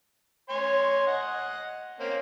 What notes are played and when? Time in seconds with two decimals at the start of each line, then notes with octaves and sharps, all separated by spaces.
0.49 C#5 G#5 C6
1.07 D#5 F#5
2.00 A#3 C4 C#4